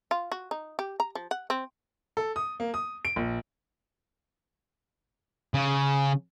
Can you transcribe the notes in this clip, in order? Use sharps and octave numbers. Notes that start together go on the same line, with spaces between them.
F4
F#4
D#4
G4
A#5
F3
F#5
C4
A4
D#6
A#3
D#6
D7
A#1
C#3